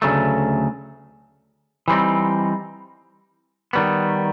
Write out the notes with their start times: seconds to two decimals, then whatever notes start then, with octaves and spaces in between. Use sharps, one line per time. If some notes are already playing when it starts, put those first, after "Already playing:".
0.02 D2 C#3 F#3 A3
1.88 E3 G3 C4 D#4
3.73 D#3 G3 B3